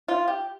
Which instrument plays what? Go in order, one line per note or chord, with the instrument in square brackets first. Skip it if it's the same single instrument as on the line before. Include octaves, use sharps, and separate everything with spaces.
[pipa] F4
G4